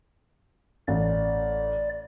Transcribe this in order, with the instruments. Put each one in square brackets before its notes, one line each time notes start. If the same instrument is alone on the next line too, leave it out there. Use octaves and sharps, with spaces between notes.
[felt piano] A1 [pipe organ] D5